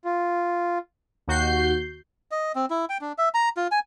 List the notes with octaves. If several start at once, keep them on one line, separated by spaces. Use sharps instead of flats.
F4
D#2 F#4 G6 C7
D#5
C4
E4
G5
D4
E5
A#5
F4
G#5